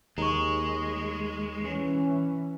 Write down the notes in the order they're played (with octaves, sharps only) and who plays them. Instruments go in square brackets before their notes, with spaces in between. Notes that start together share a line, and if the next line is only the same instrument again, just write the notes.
[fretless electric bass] D#2 [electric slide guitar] G#3 [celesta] A#5 C#6
[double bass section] E3 C#4